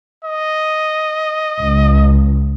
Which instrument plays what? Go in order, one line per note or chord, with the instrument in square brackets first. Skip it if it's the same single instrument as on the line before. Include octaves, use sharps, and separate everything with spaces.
[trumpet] D#5
[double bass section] C#2